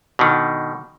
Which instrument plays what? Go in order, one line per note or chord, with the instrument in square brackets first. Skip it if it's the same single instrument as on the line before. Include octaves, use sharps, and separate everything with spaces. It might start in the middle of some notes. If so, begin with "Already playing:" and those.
[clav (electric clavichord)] B2 D3 D#3